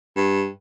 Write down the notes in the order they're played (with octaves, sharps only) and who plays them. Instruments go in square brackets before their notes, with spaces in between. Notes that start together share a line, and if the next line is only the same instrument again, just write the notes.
[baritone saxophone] G2